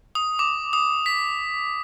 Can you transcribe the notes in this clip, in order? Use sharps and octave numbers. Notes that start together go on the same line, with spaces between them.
D#6
D6
D#6
B6